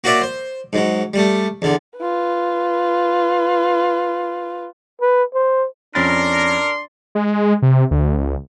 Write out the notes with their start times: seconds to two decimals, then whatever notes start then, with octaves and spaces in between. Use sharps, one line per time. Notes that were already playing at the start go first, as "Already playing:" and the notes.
0.04 A#3 F#4 C#5 D5 E5
0.21 C5
0.73 G#2 F#3
1.14 G3 A3
1.62 E2 D3
1.97 F4 B4
5.01 B4
5.34 C5
5.95 F2 C#4 D4 A#4 C6 A6
7.15 G#3
7.62 C3
7.91 D2
8.17 C#2